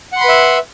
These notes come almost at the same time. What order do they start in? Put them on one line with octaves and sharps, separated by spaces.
F#5 C6 B5 B4 E5